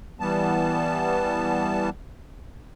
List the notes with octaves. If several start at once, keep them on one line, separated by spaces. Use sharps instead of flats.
E3 G3 B3 A5